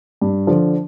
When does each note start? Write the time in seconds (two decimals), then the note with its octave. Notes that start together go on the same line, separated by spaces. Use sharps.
0.21 G2
0.47 D3 F3